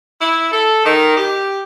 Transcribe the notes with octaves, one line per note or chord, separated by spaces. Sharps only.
E4
A4
D#3
G4